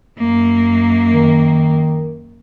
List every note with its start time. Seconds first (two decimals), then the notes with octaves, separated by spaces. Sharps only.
0.19 F#2 A#3
1.13 D#3